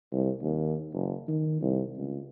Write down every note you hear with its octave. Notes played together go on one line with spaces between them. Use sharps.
C2
D#2
F#1
D#3
C2
C#2